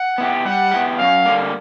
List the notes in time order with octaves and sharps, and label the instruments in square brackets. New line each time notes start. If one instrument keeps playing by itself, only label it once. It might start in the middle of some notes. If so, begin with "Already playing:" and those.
Already playing: [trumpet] F#5
[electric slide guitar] B3 E4 G4
[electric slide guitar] G3 [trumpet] F#5
[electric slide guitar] B3 E4 G4
[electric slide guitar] F#2 [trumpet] F5
[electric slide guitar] D3 G3 A#3